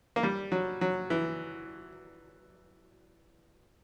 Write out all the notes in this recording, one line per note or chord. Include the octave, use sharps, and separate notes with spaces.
A#3
G3
F#3
F#3
E3